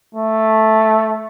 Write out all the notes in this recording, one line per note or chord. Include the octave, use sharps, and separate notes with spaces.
A3